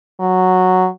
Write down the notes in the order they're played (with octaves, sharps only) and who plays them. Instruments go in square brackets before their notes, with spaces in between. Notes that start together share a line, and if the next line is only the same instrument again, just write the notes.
[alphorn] F#3